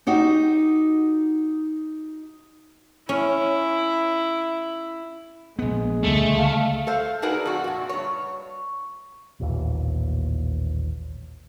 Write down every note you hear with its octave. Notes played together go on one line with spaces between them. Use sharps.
D#4 F#4 G4
C#4 E4
A#1 G#3 B3
C#2 D3 G3 A3
F5
A4 C5 F5
D4 D#4 F#4 G#4 A#4 B4
F2 F#4
A#2 F#4
G2 C#5
A1 D#2 A#2 E3